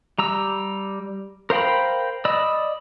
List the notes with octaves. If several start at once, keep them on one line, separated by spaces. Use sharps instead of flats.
G3 A#5 E6
A#4 C5 F5 G5 B5
D5 D#5 B5 E6